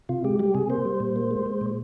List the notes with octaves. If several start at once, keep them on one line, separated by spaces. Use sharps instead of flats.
C3 F4
G#3 G4
G3 G4
C3 G#4
A#3 C5
G3
A#2
A#3
G#3
G#3
A#2